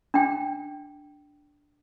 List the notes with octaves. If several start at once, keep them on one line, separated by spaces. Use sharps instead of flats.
D4 G5